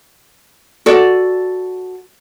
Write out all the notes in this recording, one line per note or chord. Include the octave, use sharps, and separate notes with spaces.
F#4 A4 D5